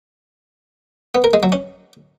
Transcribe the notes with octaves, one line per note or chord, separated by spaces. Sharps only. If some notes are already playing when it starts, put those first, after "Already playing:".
B3
A#4
G#3
F#3
C#4